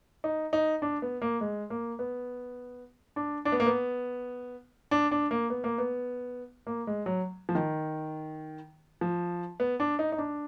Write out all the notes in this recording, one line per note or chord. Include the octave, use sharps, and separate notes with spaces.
D#4
D#4
D4
B3
A#3
G#3
A#3
B3
D4
D4
B3
A#3
B3
D4
D4
A#3
B3
A#3
B3
A#3
G#3
F#3
F3
D#3
F3
B3
D4
D#4
D#4
D4